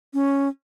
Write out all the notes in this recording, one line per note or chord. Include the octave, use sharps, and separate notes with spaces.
C#4